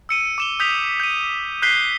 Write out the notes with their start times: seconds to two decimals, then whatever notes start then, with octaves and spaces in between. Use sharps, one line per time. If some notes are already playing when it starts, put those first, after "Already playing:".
0.09 E6 C#7 D#7
0.38 D6 E7 G7
0.60 D#6 G6 B6 F7
1.00 G6 D#7
1.62 F#6 G6 B6 C7 G7